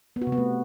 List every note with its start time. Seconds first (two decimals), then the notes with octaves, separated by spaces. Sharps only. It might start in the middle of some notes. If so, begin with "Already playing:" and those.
0.16 B3
0.22 F#4
0.27 C3
0.32 B3
0.38 A3